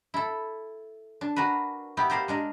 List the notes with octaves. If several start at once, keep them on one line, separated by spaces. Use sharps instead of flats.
E4 A4
D4
D4 F#4 A#4 B4
B3 E4 G4
G4 A#4 C5 D5 F5
G#3 D4 A#4